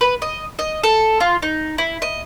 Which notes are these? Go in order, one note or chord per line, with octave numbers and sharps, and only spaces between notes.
B4
D#5
D#5
A4
F4
D#4
E4
D#5